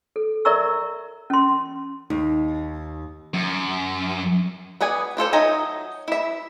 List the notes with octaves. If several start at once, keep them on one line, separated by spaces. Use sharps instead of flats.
A4
A#4 D5 E5 A#5 C#6 E6
C#4 C6
D#2 D#4
F#2
B3 G#4 D5 G#5
D4 F4 A4 C5
F#3 D#4 E5 G#5 A#5
E4 E5